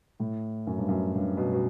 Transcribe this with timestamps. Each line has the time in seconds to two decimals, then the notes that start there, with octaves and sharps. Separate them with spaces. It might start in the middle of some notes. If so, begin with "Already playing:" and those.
0.20 A2
0.67 F#2
0.78 G2
0.89 F#2
1.15 G2
1.37 B2
1.53 B2